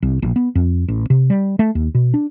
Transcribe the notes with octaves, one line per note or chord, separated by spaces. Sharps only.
C2
A#1
B3
F2
A1
C3
G3
A3
D#2
B2
D4